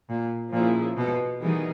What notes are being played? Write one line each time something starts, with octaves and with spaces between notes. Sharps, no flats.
A#2
A#2 F3 A#3 C#4 E4 G#4
B2
D#3 E3 G3 B3 D#4 G#4